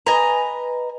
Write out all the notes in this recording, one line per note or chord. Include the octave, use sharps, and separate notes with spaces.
B4 D#5 G#5 A#5